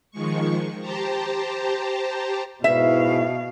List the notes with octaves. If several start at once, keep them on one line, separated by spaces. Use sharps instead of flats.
D#3 F3 G#3 C#6
G4 C5 A5 A#5
G#2 B2 E4 B4 E5 F5